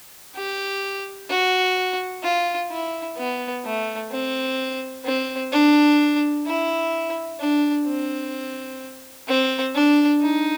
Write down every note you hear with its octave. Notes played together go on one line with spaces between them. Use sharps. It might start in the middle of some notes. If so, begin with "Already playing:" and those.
G4
F#4
F4
E4
B3
A3
C4
C4
D4
E4
D4
C4
C4
D4
D#4